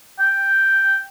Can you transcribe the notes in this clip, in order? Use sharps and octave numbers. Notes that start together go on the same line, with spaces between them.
G5